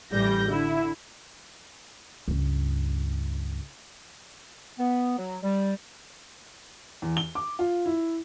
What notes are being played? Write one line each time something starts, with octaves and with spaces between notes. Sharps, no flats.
A1 E3 G3 G6 A#6
D3 E4
C#2 G2
B3
F#3
G3
E2
G7
D6
F4
E4